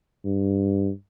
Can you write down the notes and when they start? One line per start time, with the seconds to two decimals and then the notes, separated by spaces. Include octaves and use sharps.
0.25 G2